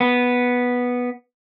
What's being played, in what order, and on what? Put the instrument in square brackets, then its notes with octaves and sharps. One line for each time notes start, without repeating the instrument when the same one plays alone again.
[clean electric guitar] B3